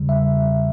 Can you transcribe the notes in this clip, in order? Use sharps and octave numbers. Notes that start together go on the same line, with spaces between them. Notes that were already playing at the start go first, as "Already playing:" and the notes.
Already playing: E2 C#3 G3
E5